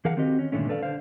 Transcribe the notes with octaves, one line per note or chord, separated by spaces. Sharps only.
E3 G#4 A#4 F5 F#5
D#3 C4 F#4 G4 D#5
C#4
G2 A#2 D3 D#3 A3 C#4
A4 B4 D5 F5
D3 C5 F5